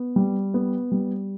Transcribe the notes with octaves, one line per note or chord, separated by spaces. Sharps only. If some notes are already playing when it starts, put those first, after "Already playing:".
Already playing: B3
G3
B3
G3